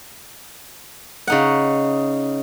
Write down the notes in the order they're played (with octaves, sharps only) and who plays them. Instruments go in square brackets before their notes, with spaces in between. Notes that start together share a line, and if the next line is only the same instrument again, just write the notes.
[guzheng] C#3 D#4 F#5